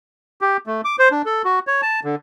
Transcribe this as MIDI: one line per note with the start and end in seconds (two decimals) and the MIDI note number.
0.41 0.57 67
0.67 0.81 57
0.85 0.96 86
0.99 1.09 72
1.11 1.22 62
1.26 1.42 69
1.45 1.59 66
1.67 1.81 73
1.82 2.00 81
2.04 2.15 50